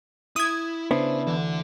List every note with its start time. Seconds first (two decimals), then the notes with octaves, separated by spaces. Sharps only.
0.36 E4 D#6 G#6
0.91 C#3 B3 D4 E4 C5
1.27 D2 E3 A4 D5